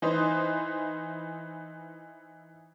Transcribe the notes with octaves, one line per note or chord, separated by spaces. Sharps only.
E3 D#4 B4 C5